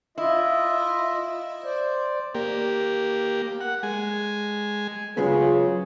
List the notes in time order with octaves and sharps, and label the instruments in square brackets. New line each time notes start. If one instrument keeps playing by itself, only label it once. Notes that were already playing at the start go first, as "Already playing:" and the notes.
[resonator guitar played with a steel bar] E4 [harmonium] F4 D#5 E5
[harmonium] C5 D5
[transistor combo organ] A#3 G4
F#5
G#3 G#5
[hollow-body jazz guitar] F#2 G#3 B3 [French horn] C#3 [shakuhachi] F4 [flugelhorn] G#4